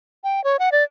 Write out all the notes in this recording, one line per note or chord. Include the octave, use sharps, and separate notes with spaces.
G5
C#5
F#5
D5